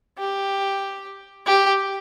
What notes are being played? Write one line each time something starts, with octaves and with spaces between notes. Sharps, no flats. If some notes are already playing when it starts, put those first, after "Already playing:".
G4
G4